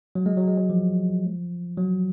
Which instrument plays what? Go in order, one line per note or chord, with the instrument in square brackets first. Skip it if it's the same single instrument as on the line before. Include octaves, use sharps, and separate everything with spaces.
[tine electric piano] F#3
G#3
F#3
G#3
F#3
F3
F#3